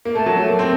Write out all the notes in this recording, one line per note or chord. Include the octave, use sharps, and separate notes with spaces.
A#3
A3 A5
F#3
A3
A#3
C4